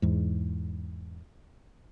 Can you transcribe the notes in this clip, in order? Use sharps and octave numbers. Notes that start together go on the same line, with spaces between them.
E2 G#2